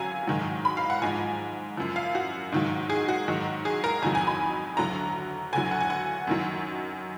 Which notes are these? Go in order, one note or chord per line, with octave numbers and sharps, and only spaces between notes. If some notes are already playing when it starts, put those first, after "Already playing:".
Already playing: F#2 D3 F#3 F5 G#5 A#5
G#2 D#3 F#3
B5
F5
F#5
G#2 F3 G#5
F#2 F3
F5
F#4
G#2 D#3 F#3
G#4
F#4
G#2 D#3 F#3
G#4
A#4
F2 D#3 F#3 G#5
G#5
B5
D2 D3 F#3 A#5
D2 D3 F#3 G#5
F#5
G#5
F#5
F#2 D#3 F#3